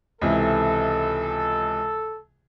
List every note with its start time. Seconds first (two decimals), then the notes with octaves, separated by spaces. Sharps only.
0.22 C#2 C3 E3 A4